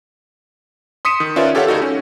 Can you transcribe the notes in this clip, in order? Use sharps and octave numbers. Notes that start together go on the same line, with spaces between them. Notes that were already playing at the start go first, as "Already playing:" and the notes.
C6 D#6 B6 C#7 D#7 E7
D#3
C#4 F4 A#4 B4 D5 E5
G4 A4 C#5 F5 F#5
C#2 D#4 F#4 A4
C#4